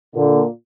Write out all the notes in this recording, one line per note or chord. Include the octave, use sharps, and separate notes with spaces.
A#2 D3